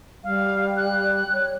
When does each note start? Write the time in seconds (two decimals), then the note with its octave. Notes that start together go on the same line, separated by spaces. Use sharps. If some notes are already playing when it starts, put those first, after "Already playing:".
0.24 G3 F5
0.77 F#6
1.33 C#5